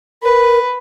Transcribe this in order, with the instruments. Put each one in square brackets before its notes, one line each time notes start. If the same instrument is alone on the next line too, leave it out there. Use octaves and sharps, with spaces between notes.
[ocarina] A#4 [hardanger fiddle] B4